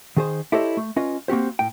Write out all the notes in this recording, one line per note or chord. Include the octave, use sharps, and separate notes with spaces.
D#3 G#4 C5
E4 G4 A4 C5 C#5 D#5
A3
C#4 F4 B4 D#5
A#3 C4 F#4 G4 C5
A2 G5